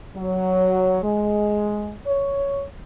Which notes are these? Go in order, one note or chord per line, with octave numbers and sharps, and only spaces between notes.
F#3
G#3
C#5